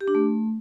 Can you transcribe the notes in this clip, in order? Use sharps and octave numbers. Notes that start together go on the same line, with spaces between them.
G4
D4
A3